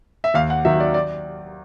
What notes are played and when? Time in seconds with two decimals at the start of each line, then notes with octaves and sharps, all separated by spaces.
0.24 E5
0.34 D#2 F5
0.50 F#5
0.65 D#3 F#3 E5
0.80 D5
0.94 D5